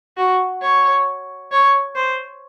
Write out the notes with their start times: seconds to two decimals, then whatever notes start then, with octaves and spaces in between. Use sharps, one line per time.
0.17 F#4
0.62 C#5
1.52 C#5
1.96 C5